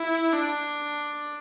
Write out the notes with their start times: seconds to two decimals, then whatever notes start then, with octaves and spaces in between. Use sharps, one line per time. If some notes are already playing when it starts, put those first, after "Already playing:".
Already playing: E4
0.33 D4